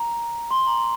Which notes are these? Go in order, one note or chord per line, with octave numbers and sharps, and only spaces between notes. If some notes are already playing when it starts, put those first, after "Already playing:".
Already playing: A#5
C6
A#5
C6